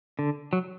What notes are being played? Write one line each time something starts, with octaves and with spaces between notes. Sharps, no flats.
D3
F#3